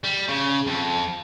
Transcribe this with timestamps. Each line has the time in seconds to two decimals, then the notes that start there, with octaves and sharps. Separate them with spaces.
0.04 G3
0.28 C#3
0.67 F2